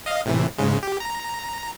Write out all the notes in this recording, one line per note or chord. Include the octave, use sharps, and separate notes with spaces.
D#5 F5
A2 C3 E3
G#2 C#3 G#3
G4
A#5